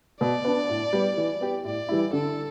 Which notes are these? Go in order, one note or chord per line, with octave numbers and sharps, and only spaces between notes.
B2 D5
B3 D4
A2
G3 B3
E3
B3 G4
A2 D5
E3 G3 E4
D3 A4